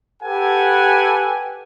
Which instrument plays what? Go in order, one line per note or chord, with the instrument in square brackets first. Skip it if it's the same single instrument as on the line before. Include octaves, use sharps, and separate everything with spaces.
[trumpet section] G4 A4 B4 F#5 G#5